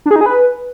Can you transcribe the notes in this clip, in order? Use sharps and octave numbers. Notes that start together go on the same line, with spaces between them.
D4
G#4
D#4
G#4
B4